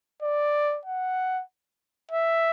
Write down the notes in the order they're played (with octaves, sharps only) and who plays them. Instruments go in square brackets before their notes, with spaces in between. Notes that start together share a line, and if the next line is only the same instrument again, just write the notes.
[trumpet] D5
F#5
E5